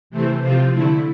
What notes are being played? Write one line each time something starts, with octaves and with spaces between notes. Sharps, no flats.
C3 E3 A3 C4
C3 F3 C4 F4
D3 A3 E4